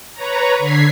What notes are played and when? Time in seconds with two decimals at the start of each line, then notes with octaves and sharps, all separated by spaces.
0.14 B4 C#5 A#5
0.58 D3 G#6 B6 C7